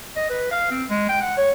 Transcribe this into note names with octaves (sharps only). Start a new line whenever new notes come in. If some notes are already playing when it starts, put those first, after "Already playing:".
D#5
B4
F5
C4
G#3
G5
F#5
C#5